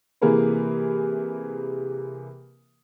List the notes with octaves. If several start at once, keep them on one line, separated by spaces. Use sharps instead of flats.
C3 E3 A#3 G#4 A#4 B4